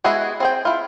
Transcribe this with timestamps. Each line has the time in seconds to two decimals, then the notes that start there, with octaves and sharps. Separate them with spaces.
0.04 G#3 B3 E4 F#4 G#4
0.40 C4 G#4 G5
0.65 E4 F4